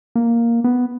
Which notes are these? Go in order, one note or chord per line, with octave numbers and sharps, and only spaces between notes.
A#3
B3